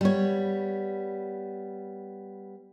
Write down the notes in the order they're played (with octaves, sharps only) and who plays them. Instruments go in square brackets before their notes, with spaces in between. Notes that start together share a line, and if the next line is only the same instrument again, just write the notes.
[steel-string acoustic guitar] G3 B3 C#5